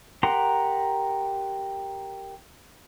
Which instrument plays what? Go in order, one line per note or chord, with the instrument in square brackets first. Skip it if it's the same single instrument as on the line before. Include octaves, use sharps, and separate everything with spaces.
[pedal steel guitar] G4 A#4 F#5 A#5 C6